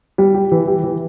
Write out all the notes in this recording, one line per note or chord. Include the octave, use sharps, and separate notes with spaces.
G3
G4
E3
G4
E3